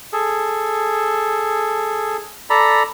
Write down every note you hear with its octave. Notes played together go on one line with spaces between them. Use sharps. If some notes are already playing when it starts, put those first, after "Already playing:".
G#4 A4
A4 D5 A#5 B5